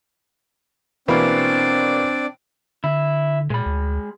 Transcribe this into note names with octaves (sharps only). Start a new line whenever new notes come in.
B2 E3 A#3 C4 D4 D5
D3 E4
A#2 G#3 B5
D2